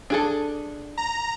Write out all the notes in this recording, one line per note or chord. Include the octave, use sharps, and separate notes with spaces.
D4 G#4 A4
A#5